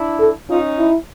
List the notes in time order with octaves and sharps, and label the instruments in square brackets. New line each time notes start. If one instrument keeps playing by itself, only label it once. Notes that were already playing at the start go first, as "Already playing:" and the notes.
Already playing: [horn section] D4 E4
[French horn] A4
[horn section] C#4 D#4 [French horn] F4
[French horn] E4